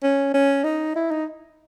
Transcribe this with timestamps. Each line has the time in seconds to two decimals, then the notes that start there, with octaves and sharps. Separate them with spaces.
0.03 C#4
0.34 C#4
0.64 D#4
0.96 E4
1.11 D#4